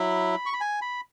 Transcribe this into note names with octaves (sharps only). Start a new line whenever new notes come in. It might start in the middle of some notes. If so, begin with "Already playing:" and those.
Already playing: F#3 E4 B5
C#6
B5
G#5
B5